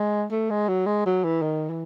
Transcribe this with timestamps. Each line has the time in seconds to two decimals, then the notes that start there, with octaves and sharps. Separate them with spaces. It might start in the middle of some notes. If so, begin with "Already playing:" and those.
Already playing: G#3
0.31 A3
0.50 G#3
0.68 F#3
0.87 G#3
1.06 F#3
1.24 E3
1.42 D#3
1.70 E3